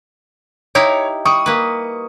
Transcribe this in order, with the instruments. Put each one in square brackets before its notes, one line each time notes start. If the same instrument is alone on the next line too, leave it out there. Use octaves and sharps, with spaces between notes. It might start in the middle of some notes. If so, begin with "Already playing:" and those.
[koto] D#4 E4 G4 [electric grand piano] C#5
[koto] G3 [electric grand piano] C#6 D#6
[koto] A#3 B4